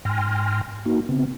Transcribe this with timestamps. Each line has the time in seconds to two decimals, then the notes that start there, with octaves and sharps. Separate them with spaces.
0.05 G#2 G5 G#5 C6 F6 A#6
0.85 A#3 D#4 F#4
1.09 C#3 B3 C4